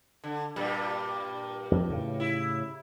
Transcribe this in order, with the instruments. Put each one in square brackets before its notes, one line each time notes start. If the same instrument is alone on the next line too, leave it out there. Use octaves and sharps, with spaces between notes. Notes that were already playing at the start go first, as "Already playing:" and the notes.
[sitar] D3
G2 A#2 G3
[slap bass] F2
A2 C#3
[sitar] E4